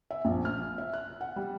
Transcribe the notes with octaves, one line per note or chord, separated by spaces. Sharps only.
E5
A#1
F6
E5
F#6
F#5
G3